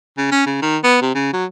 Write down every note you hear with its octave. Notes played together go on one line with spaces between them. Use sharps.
C#3
C#4
C#3
D#3
B3
C3
C#3
F#3